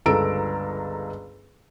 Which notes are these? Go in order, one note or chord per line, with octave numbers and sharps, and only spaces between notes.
G1 C#2 A4 A#5 E6 D7